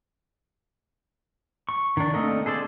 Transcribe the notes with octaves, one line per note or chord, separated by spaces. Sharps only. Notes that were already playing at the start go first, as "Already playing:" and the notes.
C#6
D#3 D4
A3 A#3 C4 D4 D#5
G#4 A4 C5 D5